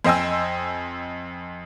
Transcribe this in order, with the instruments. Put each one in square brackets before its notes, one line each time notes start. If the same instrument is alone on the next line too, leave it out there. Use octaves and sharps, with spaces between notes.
[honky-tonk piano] F2 C5 D#5 G5 G#5 E6